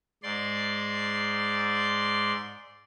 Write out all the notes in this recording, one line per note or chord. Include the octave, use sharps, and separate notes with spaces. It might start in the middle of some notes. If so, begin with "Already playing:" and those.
G#2 D5 C6